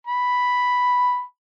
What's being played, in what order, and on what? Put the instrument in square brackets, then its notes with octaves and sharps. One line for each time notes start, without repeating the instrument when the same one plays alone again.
[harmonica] B5